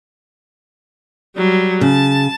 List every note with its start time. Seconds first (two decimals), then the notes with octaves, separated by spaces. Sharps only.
1.37 F#3 G3
1.81 C#3 A5